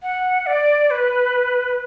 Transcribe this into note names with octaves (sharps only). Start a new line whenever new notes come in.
F#5
D5
B4